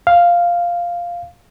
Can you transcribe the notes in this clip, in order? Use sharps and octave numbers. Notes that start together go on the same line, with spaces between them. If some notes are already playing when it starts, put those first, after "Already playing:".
F5